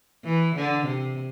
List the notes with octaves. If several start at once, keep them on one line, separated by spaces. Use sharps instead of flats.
E3
D3
C3